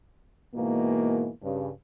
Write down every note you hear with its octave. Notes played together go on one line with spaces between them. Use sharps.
G#2 B2 E3 A#3
G2 C#3